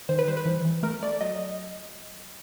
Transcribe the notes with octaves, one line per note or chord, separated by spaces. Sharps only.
D#3 C5
B4
G3 C5
B4
E3
E3
A3 A#4
A3 D5
F#3 D#5